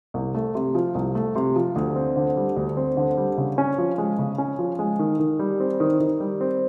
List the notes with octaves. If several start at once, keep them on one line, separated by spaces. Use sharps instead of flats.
C2
A3
C3
F3
C2
A3
C3
F3
D2
C4
D3
G3
D2
C4
D3
G3
C#3
C#4
F3
G#3
C#3
C#4
F3
G#3
D#3
D#3
G3
C4
D#3
D#3
G3
C4